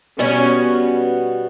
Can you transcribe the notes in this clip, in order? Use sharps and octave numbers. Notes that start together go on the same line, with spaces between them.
B2 G3 B3 C#4 F#4